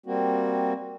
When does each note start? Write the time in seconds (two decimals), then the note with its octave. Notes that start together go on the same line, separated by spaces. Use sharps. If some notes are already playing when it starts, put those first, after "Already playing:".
0.06 G3 A#3 C4 F#4